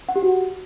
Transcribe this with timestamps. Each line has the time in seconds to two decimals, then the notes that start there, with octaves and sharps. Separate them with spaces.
0.09 F#5
0.16 G4
0.23 F#4